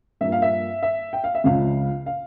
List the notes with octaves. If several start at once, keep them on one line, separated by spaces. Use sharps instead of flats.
G2 F3 A#3 E5
F5
E5
E5
G5
F5
E5
C#2 C#3 F3 F5
F5